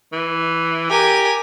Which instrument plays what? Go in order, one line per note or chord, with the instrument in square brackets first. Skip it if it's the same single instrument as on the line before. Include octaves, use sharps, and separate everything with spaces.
[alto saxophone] E3
[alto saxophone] G4 [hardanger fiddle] A#4 G#5